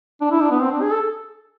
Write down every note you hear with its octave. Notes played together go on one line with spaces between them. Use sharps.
D4
E4
D4
B3
C4
D4
G#4
A4